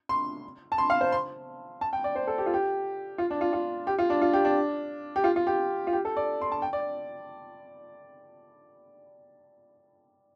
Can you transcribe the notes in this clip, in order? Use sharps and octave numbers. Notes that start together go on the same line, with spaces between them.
C6
A5
C6
F5
C5
C6
A5
G5
D5
C5
A4
G4
F4
G4
F4
D4
F4
F4
G4
F4
D4
F4
G4
D4
G4
F4
F4
G4
F4
G4
A4
D5
C6
A5
G5
D5